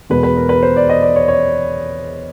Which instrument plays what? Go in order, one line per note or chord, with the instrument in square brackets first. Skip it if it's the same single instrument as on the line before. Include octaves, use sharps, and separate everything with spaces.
[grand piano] E2 B2 G#3 B4
B4
A#4
B4
C5
D5
D#5
D5
C#5
C#5